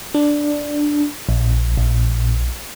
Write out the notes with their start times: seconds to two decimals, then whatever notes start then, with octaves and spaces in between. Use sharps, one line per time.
0.14 D4
1.29 A#1
1.77 A#1